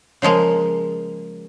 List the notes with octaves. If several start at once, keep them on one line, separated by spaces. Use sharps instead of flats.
C#3 F3 G#3 A#3